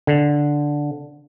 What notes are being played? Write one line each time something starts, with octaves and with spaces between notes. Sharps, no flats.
D3